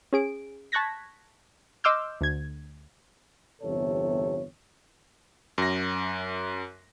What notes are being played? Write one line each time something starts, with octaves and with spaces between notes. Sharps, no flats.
C#4 G#4 D7
A5 C#6 F#6 G#6 A#6 B6
D#5 C6 D6 E6 F6 G6
D2 G#6
G1 E2 C3 A4 C#5
F#2 A#6